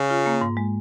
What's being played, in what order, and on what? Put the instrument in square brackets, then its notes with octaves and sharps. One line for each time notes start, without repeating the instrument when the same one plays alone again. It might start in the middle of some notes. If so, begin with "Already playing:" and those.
Already playing: [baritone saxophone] C#3
[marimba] F4
A#3
G#2
G#3